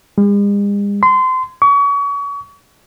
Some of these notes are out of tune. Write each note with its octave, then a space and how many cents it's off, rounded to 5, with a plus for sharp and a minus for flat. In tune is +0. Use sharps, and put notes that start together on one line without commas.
G#3 -45
C6 -25
C#6 +35